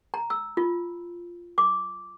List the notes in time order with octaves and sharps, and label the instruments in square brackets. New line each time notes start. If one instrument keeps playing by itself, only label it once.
[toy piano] A#5
E6
F4
D6